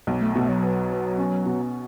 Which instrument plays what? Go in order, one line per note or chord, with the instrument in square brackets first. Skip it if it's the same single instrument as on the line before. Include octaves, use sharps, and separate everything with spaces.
[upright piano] B1
[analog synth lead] A3
[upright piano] B2 [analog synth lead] A3
[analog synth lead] F#3
[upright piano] B3
B3
C#4
B2